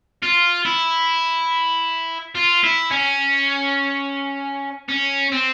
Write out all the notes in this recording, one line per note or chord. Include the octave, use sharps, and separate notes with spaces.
F4
E4
F4
E4
C#4
C#4
C4